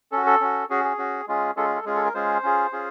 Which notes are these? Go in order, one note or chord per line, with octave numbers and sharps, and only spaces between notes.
C#4 F#4 A4
A4
C#4 F#4
C#4 F#4 G#4
G#4
C#4 F#4
G#3 C#4 F4 G#4
G#3 C#4 F4 G#4 A4
A4
G#3 C#4 F4 G#4
A4
A#4
G#3 C#4 F4 G#4 C5
C#4 F4 G#4
C#4 F4 G#4